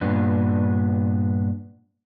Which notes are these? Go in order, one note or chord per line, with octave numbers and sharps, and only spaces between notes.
G2 A#2 B3 D4